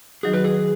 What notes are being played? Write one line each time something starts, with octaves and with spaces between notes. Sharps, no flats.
D#3 F#3 D#4 F#4 G#4
B4
G#4